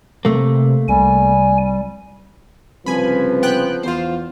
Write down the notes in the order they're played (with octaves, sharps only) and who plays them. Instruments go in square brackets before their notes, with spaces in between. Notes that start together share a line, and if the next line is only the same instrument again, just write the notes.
[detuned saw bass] C3 [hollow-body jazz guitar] A3 A#3
[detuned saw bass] C2 [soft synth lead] G3 [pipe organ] G#5
[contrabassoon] C2 [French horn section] C#3 B4 [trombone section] F3 [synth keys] G#5 B5
[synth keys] B3 G5 F#6
[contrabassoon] E2 [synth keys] F4 C5